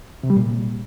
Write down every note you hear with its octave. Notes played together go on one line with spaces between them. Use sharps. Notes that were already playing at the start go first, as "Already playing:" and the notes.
C3
G3
A#2